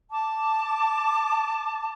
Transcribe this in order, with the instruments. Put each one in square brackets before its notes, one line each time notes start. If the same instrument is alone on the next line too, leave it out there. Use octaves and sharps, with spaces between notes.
[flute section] A5 D6